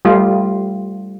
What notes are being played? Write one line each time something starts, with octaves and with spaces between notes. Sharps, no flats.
G3 A3 F4